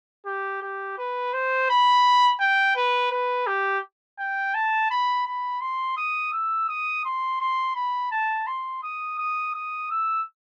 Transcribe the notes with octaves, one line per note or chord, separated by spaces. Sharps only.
G4
G4
B4
C5
B5
G5
B4
B4
G4
G5
A5
B5
B5
C6
D#6
E6
D#6
C6
C6
B5
A5
C6
D#6
D#6
D#6
E6